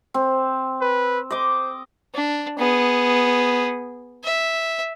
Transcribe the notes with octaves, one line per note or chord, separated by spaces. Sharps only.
C4
B4
C5 D#5 D6
D4
B3 G#4
E5